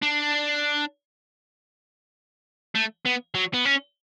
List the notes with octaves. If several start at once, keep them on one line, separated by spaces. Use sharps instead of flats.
D4
A3
B3
F#3
B3
C#4